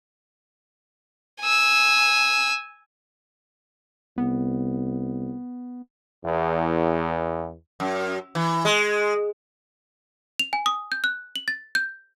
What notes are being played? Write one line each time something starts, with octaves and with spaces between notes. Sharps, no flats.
G#5 E6
C2 B3
E2
F#2
E3
G#3
F7
G#5
D#6
G6
F#6
F#7
A6
G6